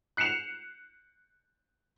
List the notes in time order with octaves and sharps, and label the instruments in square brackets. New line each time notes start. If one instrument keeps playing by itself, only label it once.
[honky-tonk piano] F#6 C7 C#7 E7 F7